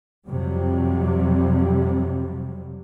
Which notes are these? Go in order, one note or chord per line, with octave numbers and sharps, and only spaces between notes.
F2 C3 F#3 G3